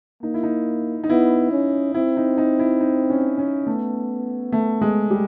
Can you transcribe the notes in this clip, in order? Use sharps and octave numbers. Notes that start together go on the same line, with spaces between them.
A#3 D#4
E4
D#4
D#4
B3 E4
C#4
C4 E4
D#4
D#4
E4
D#4
C#4
C#4
A3 B3
A3
G#3
G3